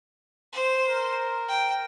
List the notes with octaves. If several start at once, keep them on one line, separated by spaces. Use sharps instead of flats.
C5
A#4
G5